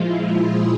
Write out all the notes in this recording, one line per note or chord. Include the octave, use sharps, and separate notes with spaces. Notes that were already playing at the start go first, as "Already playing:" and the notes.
Already playing: A#2 F3 G#3 E4 F4
G#4